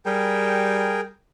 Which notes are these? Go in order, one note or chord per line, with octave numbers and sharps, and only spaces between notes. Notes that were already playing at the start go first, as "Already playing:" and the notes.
G3 G#4 A#4 G5